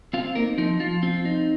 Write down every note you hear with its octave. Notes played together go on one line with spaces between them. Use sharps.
C4 F4 F5
A#3 D#4 A#4
F3 D#4
F3 F4
C4 F4
D#4